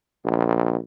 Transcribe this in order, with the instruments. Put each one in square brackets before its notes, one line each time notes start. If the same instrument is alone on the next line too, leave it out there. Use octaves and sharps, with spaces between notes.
[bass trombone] A#1